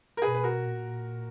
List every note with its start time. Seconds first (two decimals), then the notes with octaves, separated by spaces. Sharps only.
0.17 A#4
0.22 B2 G#4 B4
0.35 B4
0.43 F#4 A#4
0.64 A#2